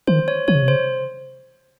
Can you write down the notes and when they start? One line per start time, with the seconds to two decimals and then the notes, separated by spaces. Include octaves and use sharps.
0.07 D#3 C5
0.28 C#5
0.48 D#3 C#5
0.55 C#3
0.62 C3
0.68 C#3 C5